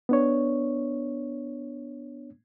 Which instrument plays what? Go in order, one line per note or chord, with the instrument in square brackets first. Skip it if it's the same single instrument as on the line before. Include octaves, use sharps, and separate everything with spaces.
[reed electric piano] B3 D4 C#5